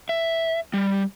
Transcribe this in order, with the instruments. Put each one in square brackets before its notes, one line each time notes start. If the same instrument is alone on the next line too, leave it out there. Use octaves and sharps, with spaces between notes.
[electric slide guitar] E5
G3